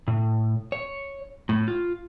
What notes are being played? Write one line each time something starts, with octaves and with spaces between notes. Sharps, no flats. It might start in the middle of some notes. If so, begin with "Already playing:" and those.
A2
C#5
A2
F4